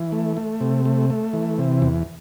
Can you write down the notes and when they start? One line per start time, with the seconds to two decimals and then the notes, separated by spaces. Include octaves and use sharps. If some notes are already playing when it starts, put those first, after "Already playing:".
Already playing: E3
0.12 A3
0.37 A3
0.61 C3
0.86 A3
1.10 A3
1.33 E3
1.58 C3
1.82 E2